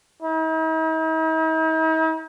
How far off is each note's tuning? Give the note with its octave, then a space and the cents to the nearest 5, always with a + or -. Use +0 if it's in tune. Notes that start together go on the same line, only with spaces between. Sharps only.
D#4 +45